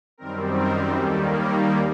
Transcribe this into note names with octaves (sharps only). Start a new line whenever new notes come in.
F#2 D#3 G3 C4 A#4
A#4
D#2 D#3 G3 A#3 A4
A#4